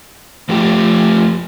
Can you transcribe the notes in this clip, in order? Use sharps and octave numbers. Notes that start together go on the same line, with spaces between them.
F3 A3 G4